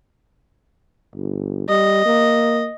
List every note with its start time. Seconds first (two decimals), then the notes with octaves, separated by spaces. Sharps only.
1.15 G1
1.68 G3 D#5
2.06 A#3